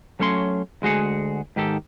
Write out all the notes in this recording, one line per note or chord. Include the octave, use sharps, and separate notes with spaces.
F#3 A3 C#4 C#5 C6
D2 G#3 F#4 G#4 F#5
G#2 D#3 G4 A4